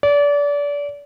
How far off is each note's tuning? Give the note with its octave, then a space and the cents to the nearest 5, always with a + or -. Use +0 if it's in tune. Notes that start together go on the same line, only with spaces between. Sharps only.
D5 -30